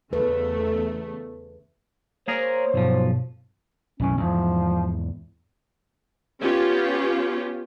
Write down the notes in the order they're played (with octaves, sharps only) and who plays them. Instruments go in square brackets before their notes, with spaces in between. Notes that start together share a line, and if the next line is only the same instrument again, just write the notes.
[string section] E2 C#3 A3 [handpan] B4
[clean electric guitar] A#3 G#4 A#4 [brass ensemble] C5 C#5
[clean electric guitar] B1 F3 [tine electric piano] G2 B2
[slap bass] B1 F#2 E3 [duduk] C#4
[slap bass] E2 G#2 [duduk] F3
[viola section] B3 C#4 F4 G4